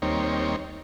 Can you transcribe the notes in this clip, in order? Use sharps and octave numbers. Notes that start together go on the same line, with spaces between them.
D#2 G3 A#3 C4 D#4 C#5